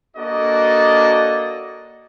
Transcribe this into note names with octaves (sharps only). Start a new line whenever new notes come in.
A#3 D4 F#4 A4 D5 D#5